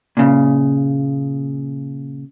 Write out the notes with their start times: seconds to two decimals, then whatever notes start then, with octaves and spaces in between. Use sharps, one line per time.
0.17 A#2 C#3